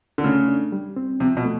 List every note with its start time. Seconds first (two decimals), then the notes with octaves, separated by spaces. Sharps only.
0.18 D3
0.24 C#3 A3
0.48 D4
0.72 G3
0.96 C4
1.20 C3 F3
1.37 B2
1.44 A3